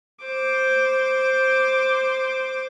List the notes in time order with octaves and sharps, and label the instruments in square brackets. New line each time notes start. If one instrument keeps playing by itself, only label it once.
[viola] C5 D6